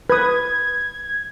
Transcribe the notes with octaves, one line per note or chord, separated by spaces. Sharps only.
B4 D#6 G#6